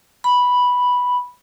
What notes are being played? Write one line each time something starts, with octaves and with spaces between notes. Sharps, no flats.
B5